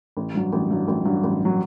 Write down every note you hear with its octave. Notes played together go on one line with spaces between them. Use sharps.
A1
G2 F#3
A1
G2 F#3
A1
G2 F#3
A1
F#3